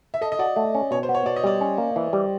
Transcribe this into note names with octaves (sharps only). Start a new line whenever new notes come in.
E5
A4 D#5
D#5
F#4 D5
A3
C#4
B2 C#5
C5
B3
C#5
B2 D5
D#5
G3 D5
C#4
A#3
E3
G3